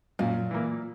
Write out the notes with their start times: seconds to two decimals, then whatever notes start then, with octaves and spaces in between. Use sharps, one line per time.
0.19 F#2 A#2
0.51 E3 A#3